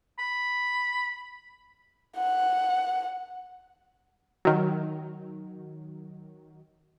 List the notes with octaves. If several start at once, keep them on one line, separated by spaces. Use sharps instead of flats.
B5
F#5
D#3 F#3